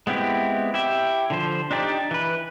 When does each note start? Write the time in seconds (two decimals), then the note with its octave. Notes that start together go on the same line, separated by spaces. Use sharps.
0.07 G#3 B3 C4 E4 G4
0.74 E4 G4 E5
1.30 D3 F3 C5
1.71 D4 D#4 G4 D5
2.11 E3 B4